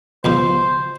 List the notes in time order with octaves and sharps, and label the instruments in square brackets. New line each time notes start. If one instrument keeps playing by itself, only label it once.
[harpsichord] C#2 B2 F3 [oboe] C5